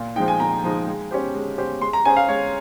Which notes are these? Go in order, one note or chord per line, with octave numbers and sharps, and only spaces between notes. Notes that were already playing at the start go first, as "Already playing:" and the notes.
Already playing: A#2
F3 G#3 D#4 G5
G#5
A#2 A#5
F3 G#3 D#4
G#3
C#4 G4 C5
G#3
C#4 G4 C5
G#3 C6
A#5
C#4 G#4 C5 G#5
F5
G#3 C#5